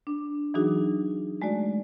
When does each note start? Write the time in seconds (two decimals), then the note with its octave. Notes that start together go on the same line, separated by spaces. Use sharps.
0.07 D4
0.54 E3 F#3 D4 D#4 F#4 G#4
1.42 G#3 A3 F#4 D5